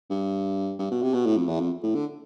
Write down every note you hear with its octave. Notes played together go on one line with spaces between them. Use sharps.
G2
G2
B2
C3
B2
A2
F2
E2
F2
A2
D3